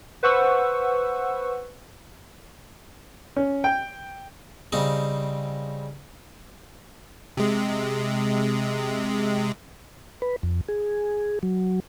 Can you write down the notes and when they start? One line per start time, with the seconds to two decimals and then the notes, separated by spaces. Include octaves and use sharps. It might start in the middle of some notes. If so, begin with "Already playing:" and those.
0.23 B4 C5 F#5 C#6 E6
3.36 C#4
3.64 G5
4.72 C#3 G3 C4 D#4
7.37 C3 G#3
10.22 B4
10.43 F2
10.68 G#4
11.43 F#3